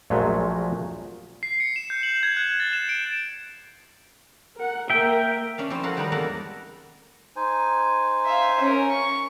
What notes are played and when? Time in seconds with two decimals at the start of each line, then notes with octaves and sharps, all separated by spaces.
0.10 A#1 A#2 F3 F#3 G#3 A3
1.43 C7
1.60 C#7
1.76 E7
1.90 G6
2.03 F#7
2.23 G#6
2.37 F#6
2.60 A6
2.73 E7
2.89 D7
4.58 A#4 F#5
4.90 A#3 A#4 E5 G5
5.58 C#4 D4 F5
5.70 F3 C4 C#4 E4
5.83 F#4 A4 A#4 F5 F#5
5.97 D#3 G3 D#4 B4 D5 A#5
6.12 E2 G#3 A#3 A4 F#5
7.36 D#4 C5 G#5
8.26 E5 F5
8.61 C#4 A#4
8.91 C#6